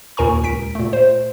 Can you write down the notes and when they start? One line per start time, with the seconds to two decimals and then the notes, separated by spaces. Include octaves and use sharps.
0.17 D#2 A#2 A#4 G#5 A#5 C#6
0.43 C#2 B6 D7
0.75 A#2 A3
0.93 C5